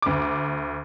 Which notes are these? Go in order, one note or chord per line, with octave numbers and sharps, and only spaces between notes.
D2 D6